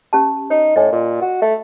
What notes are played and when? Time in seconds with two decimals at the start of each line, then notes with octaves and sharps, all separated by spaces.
0.13 C#4 G4 A5
0.50 D#4 C#5
0.76 A2 D#5 G#5
0.92 A#2
1.22 F#4
1.42 A3